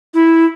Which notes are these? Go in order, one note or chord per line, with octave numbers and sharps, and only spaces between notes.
E4